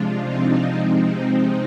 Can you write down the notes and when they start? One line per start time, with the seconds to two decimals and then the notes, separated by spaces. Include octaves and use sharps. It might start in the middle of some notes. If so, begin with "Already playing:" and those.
Already playing: C3 F3 G#3 D4 F4
0.21 C4 D#4
0.66 C3 F3 G#3 C4 D#4